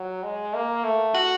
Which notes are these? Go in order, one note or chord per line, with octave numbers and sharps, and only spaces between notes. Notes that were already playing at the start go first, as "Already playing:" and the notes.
Already playing: F#3
G#3
A#3
A3
F#4